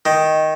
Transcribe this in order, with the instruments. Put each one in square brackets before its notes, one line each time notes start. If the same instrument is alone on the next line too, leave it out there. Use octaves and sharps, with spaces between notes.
[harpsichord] D#3